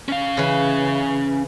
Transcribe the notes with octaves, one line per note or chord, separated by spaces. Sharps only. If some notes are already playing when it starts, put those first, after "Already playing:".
C#4 F5
C#3 E3